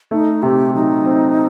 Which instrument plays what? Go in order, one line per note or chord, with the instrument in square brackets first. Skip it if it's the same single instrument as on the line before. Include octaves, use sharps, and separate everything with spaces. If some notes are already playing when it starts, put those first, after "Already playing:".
[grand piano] A3 [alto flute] D#4
[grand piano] C3 [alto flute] G4
[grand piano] F#3 [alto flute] D#4
[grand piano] C4